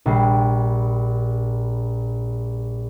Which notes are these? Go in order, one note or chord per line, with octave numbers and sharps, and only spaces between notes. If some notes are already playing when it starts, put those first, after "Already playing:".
A#1 G3 C7